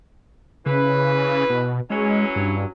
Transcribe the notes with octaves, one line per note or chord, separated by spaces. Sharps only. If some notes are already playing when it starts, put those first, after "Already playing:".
C#3 E3 B4
B2
E3 F#3 G#3 C#4
G2